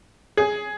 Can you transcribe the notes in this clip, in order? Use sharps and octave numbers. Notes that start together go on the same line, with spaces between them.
G#4